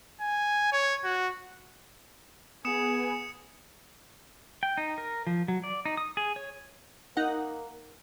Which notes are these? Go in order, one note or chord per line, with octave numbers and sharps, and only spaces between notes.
G#5
C#5
F#4
B3 G#4 G#5 D#6 C#7 E7
G5
D#4
A#4
F3
F#3
D5
D#4
D#6
G#4
C#5
A#3 D#4 F#5